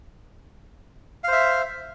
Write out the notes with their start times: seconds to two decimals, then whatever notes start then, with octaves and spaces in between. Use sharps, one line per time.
1.24 F5
1.28 C5
1.32 E5